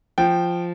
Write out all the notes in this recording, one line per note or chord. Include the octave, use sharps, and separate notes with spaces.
F3 G5